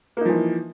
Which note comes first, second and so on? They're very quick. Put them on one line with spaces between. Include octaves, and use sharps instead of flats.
A#3 D#4 F3 E3